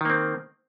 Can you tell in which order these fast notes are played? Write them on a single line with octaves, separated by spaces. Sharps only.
D#3 A#3 C4